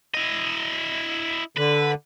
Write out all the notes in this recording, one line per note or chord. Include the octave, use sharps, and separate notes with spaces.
E4 D#5
D3 B4